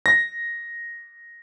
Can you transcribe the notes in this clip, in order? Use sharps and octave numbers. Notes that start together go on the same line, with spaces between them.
A#6